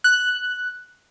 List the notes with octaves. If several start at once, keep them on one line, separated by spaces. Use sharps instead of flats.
F#6